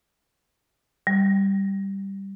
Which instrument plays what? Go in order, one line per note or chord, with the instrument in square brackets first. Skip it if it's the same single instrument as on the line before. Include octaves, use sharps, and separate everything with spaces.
[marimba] G3